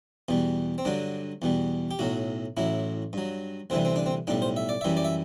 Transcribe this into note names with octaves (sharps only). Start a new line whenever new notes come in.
E2 B2 G3
C4
G2 D3 F#3 D4
E2 B2 G3
G4
B1 A2 F#3 F#4
A1 A2 F#3 E4
G2 F#3
D2 C3 E3 G3 C4
C4
D4
C4
B1 A2 G3 D4
C5
E5
D5
F#2 E3 G3 E5
D5
E5